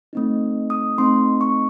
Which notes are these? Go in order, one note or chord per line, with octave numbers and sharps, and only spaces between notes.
A3 C4 D#4
D#6
A3 C4 D#4 C6
C#6